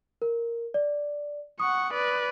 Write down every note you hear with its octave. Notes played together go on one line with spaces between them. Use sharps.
A#4
D5
F#5 C#6 D#6
B4 D5